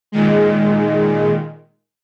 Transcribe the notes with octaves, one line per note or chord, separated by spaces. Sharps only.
A#2 D#3 G#3